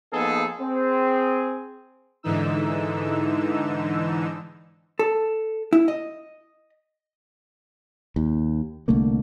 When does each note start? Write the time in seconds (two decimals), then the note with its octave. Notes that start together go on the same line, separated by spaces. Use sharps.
0.13 F3 A#3 B3 D#4 G#4 A4
0.61 C4 G#4
2.23 G#2 D3 E3 D#4 E6
4.99 A4
5.73 E4
5.88 D#5
8.16 D#2
8.88 C2 D3 A3 A#3